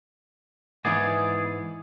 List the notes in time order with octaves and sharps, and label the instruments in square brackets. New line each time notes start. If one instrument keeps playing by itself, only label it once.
[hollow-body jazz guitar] G#2 E3 [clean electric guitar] B3 G#4 D5